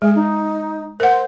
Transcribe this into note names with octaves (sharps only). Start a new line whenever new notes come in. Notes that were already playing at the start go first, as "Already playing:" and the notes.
G#3 G#4
D#4
A#4 C5 F#5